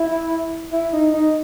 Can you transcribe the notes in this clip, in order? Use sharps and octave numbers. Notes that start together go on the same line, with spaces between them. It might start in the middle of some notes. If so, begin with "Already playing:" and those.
Already playing: E4
E4
D#4
D#4